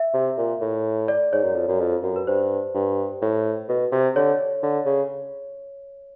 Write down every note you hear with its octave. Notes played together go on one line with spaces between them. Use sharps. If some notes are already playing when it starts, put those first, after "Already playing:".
Already playing: E5
C3
A#2
A2
D5
G#2 C#5
F#2
F2
F#2
F2
F#2
B4
G2 C5
G2
A2
B2
C3
D3 C#5
D3
C#3